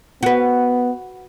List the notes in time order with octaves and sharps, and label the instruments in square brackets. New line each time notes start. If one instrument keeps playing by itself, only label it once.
[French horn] B3 [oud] F#4 B4